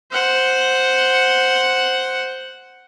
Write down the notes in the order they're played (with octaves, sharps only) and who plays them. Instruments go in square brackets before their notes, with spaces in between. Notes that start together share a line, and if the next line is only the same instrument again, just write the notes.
[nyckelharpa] C5 F#5